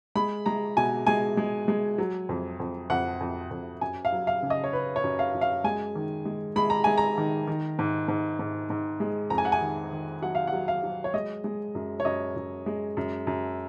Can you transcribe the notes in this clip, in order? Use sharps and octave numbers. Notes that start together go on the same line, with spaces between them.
G#3 B5
G#3 A#5
B2 G#5
G#3 G#5
G#3
G#3
F#3
F2
F2
F2 F#5
F2
F2
F#2 G#5
F5
F#3
F5
C#3
D#5
C#5
C#3 B4
C#5
F#2
F5
F#2
F5
G#3 G#5
D#3
G#3
G#3 B5
A#5
G#3 G#5
A#5
D#3
D#3
G#2
G#2
G#2
G#2
G#3
F2 A#5
G#5
F#5
G#5
D#3
D#3
F#3 F#5
F5
F#5
F#3
F5
F#3
C#5
G#3 D#5
G#3
F#2
C#5
F#2 D#5
F#2
G#3
F#2
F#2